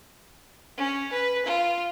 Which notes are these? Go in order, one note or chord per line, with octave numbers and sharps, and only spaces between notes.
C#4
B4
F4